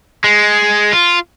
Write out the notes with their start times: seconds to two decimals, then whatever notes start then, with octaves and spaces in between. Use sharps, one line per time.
0.24 G#3
0.93 F4